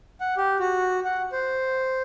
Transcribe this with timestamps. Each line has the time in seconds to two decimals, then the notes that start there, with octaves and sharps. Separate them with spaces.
0.21 F#5
0.37 G4
0.60 F#4
1.05 F#5
1.32 C5